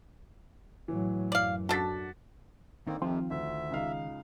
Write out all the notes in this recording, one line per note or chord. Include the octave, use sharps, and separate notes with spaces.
A2 E3 F#3
F#2 D5 F5
D4 F#4 A4 A6 B6
D3 D#3 A#3 C4 D#4
F2 C3 D#3 F3 C4 F4
D2 E5
C#2 D#4 F5